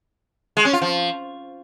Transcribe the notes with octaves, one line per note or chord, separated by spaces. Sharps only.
G#3
C#4
F4
F3